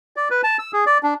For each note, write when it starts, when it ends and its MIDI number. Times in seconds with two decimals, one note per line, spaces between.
0.16 0.28 74
0.31 0.41 71
0.44 0.57 81
0.59 0.71 88
0.73 0.84 68
0.86 0.98 74
1.03 1.14 62